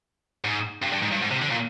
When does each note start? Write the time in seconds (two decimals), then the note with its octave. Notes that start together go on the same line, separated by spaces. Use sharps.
0.45 G#2
0.83 G2
0.93 G2
1.02 G#2
1.12 G2
1.22 G#2
1.31 C3
1.42 D3
1.51 A#2